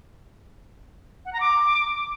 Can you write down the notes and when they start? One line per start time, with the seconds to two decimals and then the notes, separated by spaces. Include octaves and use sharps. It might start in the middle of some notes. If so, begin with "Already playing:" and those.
1.25 F#5
1.33 A#5
1.40 D6